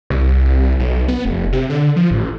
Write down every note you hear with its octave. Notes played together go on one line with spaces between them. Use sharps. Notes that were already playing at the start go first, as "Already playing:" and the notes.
C2
B1
B3
F1
C3
D3
F3
A1